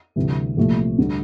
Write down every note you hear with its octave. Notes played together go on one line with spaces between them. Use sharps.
D2 C3 E3 G3
C2 A#2 F3 A3
D2 D3 G3